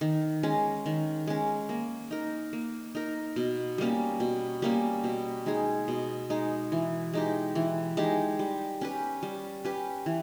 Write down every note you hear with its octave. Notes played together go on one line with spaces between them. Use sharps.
D#3
G#3 C#4
D#3
G#3 C#4
A#3
D#4 A#4
A#3
D#4 A#4
B2
G3 A#3 C#4
B2
G3 A#3 C#4
B2
G#3 D#4 G#4
B2
G#3 D#4 G#4
E3
G#3 D#4 G4
E3
G#3 D#4 G4
G3
C#4 G4 B4
G3
C#4 G4 B4
E3